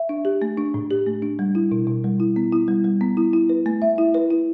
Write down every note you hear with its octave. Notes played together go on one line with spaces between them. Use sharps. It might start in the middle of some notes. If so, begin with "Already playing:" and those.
Already playing: E5
D4
G4
A3
D4
A2
G4
A3
D4
G3
E4
B2
B2
G3
E4
B3
E4
G3
G3
B3
E4
E4
B4
A3
E5
E4
B4
E4